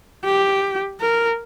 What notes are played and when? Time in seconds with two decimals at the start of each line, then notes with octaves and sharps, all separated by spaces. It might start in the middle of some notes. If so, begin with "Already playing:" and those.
0.24 G4
1.01 A#4